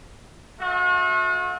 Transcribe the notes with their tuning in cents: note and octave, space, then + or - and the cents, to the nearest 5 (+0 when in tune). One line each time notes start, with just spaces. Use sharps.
A3 -20 F#4 -45